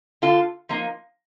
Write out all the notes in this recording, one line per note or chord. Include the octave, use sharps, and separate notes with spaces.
D3 F4 A4
F3 A#3 D#4